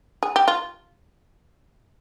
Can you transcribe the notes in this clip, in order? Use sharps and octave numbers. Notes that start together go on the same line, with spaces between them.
G#4
G4
F4